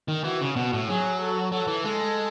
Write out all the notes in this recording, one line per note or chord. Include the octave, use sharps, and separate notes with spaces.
D#3
E3 F#4
C#3
B2 F#4
A2
F#3 G#4
A4
F#3 A4
E3
G#3 A4